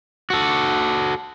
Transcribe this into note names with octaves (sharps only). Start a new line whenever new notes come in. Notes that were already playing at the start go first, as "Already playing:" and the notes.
F#4 A4